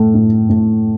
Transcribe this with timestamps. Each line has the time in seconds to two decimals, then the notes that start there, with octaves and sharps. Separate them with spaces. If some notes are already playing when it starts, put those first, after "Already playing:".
Already playing: A2 A3
0.14 A2
0.49 A2